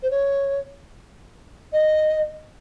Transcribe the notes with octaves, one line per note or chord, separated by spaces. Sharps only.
C5
C#5
D#5